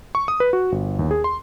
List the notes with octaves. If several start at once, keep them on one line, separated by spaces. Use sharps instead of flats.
C#6
D#6
B4
F#4
G1
D#2
G#4
C6